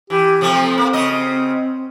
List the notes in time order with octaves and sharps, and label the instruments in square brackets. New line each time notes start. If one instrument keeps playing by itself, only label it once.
[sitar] E3 [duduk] G4
[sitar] C3 F3 A3 [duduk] C4
[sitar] A#3
C#3 F#4 D#5
[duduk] C4